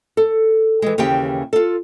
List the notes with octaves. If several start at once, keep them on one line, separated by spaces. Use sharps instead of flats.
A4
E3 G#3
D#2 C#3 E3 G4 G5
F4 A4